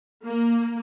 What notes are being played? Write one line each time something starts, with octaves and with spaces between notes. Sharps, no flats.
A#3